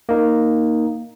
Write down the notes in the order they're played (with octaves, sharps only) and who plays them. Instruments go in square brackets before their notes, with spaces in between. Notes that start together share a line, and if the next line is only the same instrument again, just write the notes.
[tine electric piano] A#3 D#4